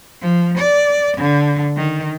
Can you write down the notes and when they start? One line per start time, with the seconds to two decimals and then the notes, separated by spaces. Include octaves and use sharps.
0.22 F3
0.58 D5
1.18 D3
1.77 D#3